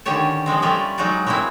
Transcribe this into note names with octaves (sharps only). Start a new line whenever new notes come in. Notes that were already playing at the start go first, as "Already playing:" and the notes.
D3 D#3 C#4 G4 C#5 A5
F3 G3 G#3 C4
G3 A3 C#4 F4 D5 E5
F#3 G#3 D#4 F#4 D5
F#3 G#3 A#3 C4 E4